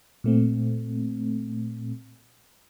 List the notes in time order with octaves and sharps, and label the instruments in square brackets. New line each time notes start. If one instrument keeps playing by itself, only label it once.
[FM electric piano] A#2 A3 C4